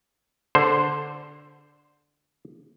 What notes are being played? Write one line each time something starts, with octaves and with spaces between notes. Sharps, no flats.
D3 C5